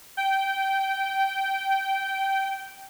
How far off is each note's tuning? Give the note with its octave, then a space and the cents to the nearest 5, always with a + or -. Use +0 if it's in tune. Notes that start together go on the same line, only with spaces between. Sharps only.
G5 -15